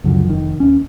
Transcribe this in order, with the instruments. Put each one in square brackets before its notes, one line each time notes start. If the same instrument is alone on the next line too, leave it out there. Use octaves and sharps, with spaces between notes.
[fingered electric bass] C#2 F#2 D3 F3
F1 D#3
D#2 C#4